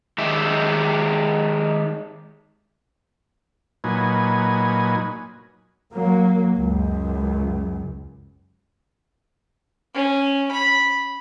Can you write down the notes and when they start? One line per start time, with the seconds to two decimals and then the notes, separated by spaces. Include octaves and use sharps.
0.18 D#3 G#3 G4 E5
3.84 A#2 F#3 D#4 B4 G#5
5.93 F#3 A#3
6.56 C#2 F#2
9.94 C#4
10.51 B5